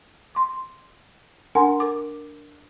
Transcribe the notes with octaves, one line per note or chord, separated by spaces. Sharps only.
C6 D6
D4 A#4 F#5 G#5 A#5 C6
A#4 D6